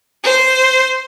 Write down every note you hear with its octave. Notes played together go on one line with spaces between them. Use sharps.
C5